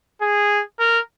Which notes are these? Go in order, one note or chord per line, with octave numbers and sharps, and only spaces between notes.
G#4
A#4